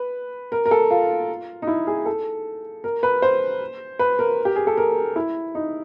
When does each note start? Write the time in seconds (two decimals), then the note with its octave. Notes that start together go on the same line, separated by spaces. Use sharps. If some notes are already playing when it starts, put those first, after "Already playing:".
Already playing: B4
0.52 A#4
0.66 A#4
0.71 A4
0.91 F4
1.62 D#4
1.67 E4
1.87 G#4
2.06 A4
2.84 A#4
3.03 B4
3.22 C5
3.99 B4
4.19 A#4
4.45 G4
4.56 G#4
4.67 A4
4.77 A#4
5.16 E4
5.55 D#4